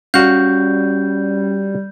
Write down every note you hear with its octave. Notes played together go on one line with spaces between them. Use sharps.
G3 C#4 F#4 F5 G6